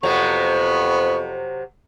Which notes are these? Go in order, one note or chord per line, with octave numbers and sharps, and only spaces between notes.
F2 C3 F#3 B3 C#6